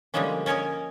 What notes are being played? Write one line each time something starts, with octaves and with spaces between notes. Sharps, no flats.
D3 F3 G3 G#3 A#3 C#4
C#4 A#4 C#5 D#5 G#5